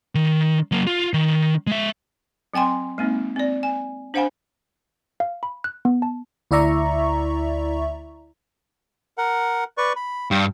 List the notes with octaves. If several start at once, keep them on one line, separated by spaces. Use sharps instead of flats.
D#3
F#3 A#3
F4
D#3
G#3 E5
F#3 C4 G5 G#5 C6
G#3 A#3 C4 D#4
C4 D5
G#5
D4 C5 F5 F#5 G#5 B5
F5
B5
F#6
B3
A5
D2 E4 D5 E5 A#5 C#6
A#4 F#5
B4 D5 C#6
B5
G2 F5 G5